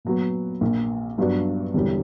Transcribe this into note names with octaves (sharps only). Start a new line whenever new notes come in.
A#2 F#3 B3 F#4
A#1 A#2 A#3
G2 F#3 B3 D4 F#4
E1 E2 D3 G3